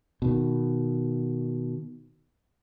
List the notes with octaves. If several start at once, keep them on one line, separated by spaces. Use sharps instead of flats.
B2 D#3